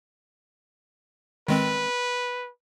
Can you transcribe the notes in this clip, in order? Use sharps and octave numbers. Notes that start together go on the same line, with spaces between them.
D#3 G#3 C4 B4